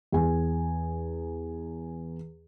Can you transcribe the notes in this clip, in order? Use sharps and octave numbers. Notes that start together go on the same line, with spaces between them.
E2 G#5